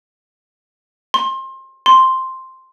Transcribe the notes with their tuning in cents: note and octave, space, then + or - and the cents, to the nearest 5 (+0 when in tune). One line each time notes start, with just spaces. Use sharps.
C6 +25
C6 +0